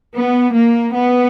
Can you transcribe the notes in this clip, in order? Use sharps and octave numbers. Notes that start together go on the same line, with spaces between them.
B3
A#3
B3